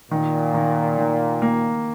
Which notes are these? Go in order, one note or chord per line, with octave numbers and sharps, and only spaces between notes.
A#2 D#3
D#3
D#3
A#3